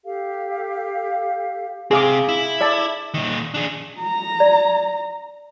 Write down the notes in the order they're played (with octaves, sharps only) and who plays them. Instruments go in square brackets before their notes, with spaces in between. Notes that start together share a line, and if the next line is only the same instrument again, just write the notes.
[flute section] G4 A4 F5
[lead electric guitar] C3 C4 [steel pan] G#4 F5 D6
[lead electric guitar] E4
[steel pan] D5 E5 A5
[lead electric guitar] A#2 D#3
D4 G#4
[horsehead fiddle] A#5
[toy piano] D5